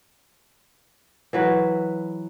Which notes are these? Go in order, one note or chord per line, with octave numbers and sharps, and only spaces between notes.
E3 F#3 B4